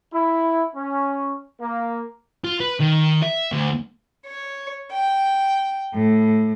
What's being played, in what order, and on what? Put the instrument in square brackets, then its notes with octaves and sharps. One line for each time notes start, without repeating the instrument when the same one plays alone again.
[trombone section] E4
C#4
A#3
[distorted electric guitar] F4
B4
D#3
E5
D2
[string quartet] C#5
G5
A2